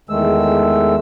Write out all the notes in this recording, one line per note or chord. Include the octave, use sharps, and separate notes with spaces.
E2 D#3 G#3 A3 E6